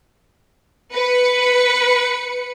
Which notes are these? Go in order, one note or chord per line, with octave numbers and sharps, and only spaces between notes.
B4 C#7